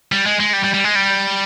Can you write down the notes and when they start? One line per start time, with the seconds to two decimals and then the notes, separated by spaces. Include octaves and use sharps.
0.12 G3
0.26 G#3
0.40 G#3
0.53 G3
0.64 G3
0.74 G3
0.84 G#3
0.95 G3